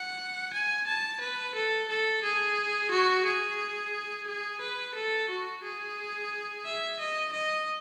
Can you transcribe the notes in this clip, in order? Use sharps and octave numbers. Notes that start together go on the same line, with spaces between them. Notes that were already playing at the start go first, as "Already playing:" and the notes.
Already playing: F#5
G#5
A5
B4
A4
A4
G#4
F#4
G#4
G#4
B4
A4
F#4
G#4
E5
D#5
D#5